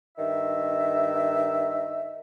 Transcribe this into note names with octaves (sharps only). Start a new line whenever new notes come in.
G2 D#3 E5